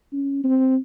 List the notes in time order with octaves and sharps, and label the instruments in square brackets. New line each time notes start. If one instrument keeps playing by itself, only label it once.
[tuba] C#4
C4